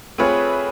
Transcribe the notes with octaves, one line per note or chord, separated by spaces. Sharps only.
A3 C4 F4 G#4 B4 C#5